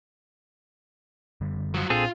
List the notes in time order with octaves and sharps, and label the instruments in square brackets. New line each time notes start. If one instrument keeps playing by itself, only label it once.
[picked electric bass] F#2 D3 G3
[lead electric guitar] F3 F#3
[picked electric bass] A#2 D4 [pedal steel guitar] C4 G#4 A4 [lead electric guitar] F4